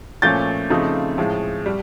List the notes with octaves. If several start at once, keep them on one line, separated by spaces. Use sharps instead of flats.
A#2 F3 A3 C#4 G6 A6
C#3 F3 A3 C4 D#4
A2 F3 G#3
G3